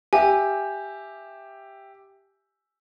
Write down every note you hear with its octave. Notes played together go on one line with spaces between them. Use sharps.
G4 E5 G#5